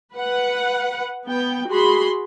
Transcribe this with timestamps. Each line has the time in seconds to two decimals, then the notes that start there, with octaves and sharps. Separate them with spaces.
0.15 B4 F#5
1.27 B3 G5
1.69 F#4 G#4 B5 C6